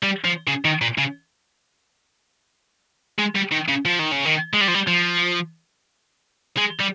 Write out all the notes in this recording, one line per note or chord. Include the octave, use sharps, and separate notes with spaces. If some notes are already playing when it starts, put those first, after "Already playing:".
G3
F3
C#3
D#3
A#2
C#3
G#3
G3
D#3
C#3
F3
D#3
C#3
D#3
G#3
G3
F3
G3
F3
G#3
G3